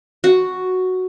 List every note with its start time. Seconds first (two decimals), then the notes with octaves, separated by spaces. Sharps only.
0.24 F#4